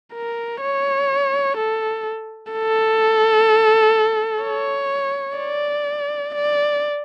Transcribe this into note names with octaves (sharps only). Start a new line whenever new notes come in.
A#4
C#5
A4
A4
C#5
D5
D5